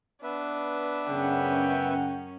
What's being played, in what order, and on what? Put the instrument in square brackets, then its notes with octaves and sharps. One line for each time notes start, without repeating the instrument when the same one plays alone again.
[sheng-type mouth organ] B3 B4 E5 [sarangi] D4
[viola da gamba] F#2 C#4 [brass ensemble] C#3 F#5 G5